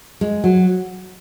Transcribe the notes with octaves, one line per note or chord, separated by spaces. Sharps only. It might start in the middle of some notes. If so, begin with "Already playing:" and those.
G#3
F#3